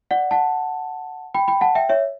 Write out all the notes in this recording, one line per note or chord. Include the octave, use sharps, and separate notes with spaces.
D5 F#5
F#5 A5
G5 B5
G5 B5
F#5 A5
E5 G5
C#5 E5